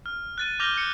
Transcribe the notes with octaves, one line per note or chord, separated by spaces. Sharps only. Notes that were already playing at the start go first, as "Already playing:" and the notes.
F6
F#6 A6 D#7
D6 F6 G6 A#6 F7 G7
G6 C#7